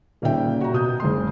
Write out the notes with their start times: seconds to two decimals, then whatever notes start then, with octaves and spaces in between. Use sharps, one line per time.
0.22 D#1 A#2 C#3 D#4 E5 G5
0.61 F#4 A#5
0.73 B2 D#6 G6
1.00 F#1 G#3 C6